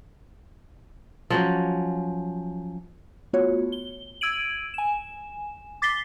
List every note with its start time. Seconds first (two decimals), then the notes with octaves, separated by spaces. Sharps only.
1.30 F3 F#3 C#4
3.33 A3 B3 F4 F#4 C#5
3.72 G7
4.21 E6 G#6 D7 D#7 F#7
4.74 G#5 E7
5.82 D6 A6 B6 C7 G7